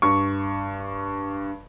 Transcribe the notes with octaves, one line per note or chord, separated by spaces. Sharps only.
G2 C#6